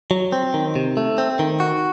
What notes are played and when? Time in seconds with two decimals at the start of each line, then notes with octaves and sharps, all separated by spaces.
0.11 F#3
0.32 C4
0.54 D#3
0.76 C3
0.97 A3
1.18 C4
1.39 D#3
1.60 F#4